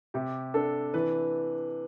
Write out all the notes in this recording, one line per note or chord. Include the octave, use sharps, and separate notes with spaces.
C3 G4
D4 A4
E3 B4